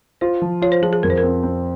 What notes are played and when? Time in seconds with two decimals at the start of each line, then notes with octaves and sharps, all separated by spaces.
0.21 F4 C5
0.42 F3
0.62 F4 C#5
0.72 C5
0.82 F3 G#4
0.93 G#4
1.03 F2 A#4
1.10 C5
1.18 A#4
1.23 C4
1.43 C4